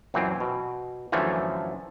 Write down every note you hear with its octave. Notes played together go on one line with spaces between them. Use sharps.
F#2 A#2 E3 F#3 C4
B2
F#2 D3 E3 F3 A3